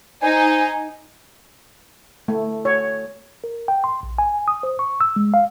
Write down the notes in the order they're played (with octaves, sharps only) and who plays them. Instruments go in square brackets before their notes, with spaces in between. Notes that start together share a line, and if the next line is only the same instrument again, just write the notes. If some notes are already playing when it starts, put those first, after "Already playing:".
[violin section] D#4 [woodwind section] C5 G#5
[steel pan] A3
C#5
[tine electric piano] A#4
G5
C6
A#1
G#5
D#6
C5
C#6
E6
G#3
F5